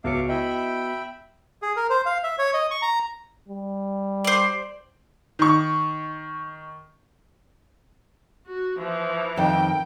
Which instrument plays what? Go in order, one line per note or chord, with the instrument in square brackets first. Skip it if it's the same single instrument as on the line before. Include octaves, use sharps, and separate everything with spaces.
[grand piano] C#2 C#4 [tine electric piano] B3 F#4 C#7 [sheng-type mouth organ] E5 F5 D6
[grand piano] E4 D#5 [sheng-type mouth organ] E5 G5 B5
[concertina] G#4
A#4
C5
F5
E5
C#5
D#5
C#6
A#5
[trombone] G3
[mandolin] C5 D5
[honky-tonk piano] D#3 C#6
[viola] F#4
E3 F3
[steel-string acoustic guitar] F2 D#3 [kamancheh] G5